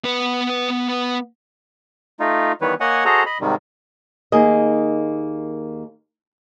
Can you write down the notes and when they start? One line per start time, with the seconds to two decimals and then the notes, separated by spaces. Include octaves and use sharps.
0.04 B3 B4
2.20 A3 D#4 F4
2.61 D#3 E3 G3 B3 B4 C#5
2.80 A#3 C#5 D#5 F#5 G#5
3.05 F#4 G#4 A4 C5 D#5 A#5
3.26 D#5 B5
3.41 G#2 C3 D#3 G3
4.32 D#2 A#3 D#4 G#4 D#5